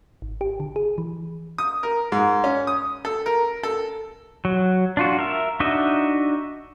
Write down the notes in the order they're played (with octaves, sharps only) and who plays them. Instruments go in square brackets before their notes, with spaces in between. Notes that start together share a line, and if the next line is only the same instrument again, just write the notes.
[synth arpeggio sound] G#1
G4
D3
G#4
E3
[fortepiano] D#6
A#4
G#2
C#4
D#6
A4
A#4
A4
[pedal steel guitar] F#3
D4 F4 F#4
A#4 E5
D4 D#4 F#4 D#5 E5